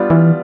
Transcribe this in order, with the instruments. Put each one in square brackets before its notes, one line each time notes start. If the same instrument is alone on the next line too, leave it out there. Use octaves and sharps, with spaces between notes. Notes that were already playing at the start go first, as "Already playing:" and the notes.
Already playing: [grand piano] G3 B3 D4 F4
[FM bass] E3